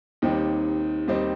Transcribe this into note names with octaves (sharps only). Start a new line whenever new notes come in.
D#2 D#3 G3 C4 D#4
D#2 D#3 G3 C4 D#4